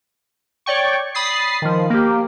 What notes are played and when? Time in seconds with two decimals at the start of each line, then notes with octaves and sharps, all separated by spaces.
0.66 C#5 D5 G5 C#6
1.15 B5 D#6 A6 C7
1.62 D#3 F3
1.90 A#3 G4